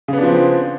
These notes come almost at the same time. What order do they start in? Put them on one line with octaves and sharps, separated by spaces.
C#3 B3 D4 F3 C4